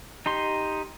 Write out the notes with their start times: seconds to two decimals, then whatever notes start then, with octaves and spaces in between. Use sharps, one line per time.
0.26 D#4 G4 C6